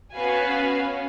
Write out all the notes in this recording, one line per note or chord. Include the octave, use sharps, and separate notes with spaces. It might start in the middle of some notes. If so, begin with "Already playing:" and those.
B3 C#4 F#4 B4 F5 G#5
C#4